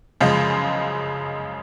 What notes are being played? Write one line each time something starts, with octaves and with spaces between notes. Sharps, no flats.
F#2 C#3 F3 G#3